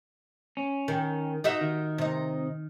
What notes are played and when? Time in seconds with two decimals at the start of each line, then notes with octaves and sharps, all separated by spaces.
0.57 C#4
0.88 D#3
1.44 D#4 F#4 E5
1.61 D#3
1.98 C3 D#4